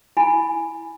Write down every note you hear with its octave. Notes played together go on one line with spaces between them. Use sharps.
E4 G#5 B5